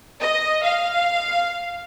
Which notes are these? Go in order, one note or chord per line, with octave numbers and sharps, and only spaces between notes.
D#5
F5